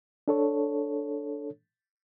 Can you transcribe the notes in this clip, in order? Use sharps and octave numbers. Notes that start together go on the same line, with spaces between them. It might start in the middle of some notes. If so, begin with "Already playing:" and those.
D4 A4 C#5